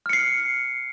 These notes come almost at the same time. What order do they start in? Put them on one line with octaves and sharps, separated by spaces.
F6 C#7 C7